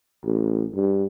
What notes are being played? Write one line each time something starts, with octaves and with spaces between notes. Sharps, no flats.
A1
G2